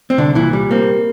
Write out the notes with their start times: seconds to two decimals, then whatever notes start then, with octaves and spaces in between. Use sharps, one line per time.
0.10 C4
0.18 C2 D3 D4
0.35 A#2 E3 E4
0.53 G3
0.71 A#3 C4